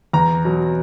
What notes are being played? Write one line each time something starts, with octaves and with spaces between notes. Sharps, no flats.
E2 A#5
B2 F#3